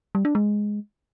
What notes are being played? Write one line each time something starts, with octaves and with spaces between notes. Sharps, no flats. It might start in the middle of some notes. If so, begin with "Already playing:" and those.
G3
D4
G#3